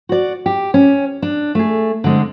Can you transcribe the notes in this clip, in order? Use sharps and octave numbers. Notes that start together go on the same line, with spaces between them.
F#4 D5
G4
C#4
D4
A3 G#4
D3 G#3 C4